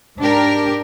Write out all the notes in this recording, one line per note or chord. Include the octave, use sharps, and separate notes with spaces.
G#2 D4 G4 A#4